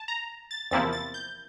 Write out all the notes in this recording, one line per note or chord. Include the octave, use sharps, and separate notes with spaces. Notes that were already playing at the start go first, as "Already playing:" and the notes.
Already playing: A5
A#5
A6
E2 C3 F3 A#3 E4 A6
A6
G6